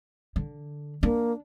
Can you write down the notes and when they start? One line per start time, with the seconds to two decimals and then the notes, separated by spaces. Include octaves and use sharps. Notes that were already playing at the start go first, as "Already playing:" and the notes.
0.36 D3
1.03 A#3 D4